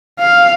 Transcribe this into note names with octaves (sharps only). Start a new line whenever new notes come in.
F5